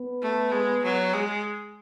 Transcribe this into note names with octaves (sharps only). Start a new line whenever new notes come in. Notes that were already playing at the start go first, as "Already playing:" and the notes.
Already playing: B3
A3
G#3
F#3
G#3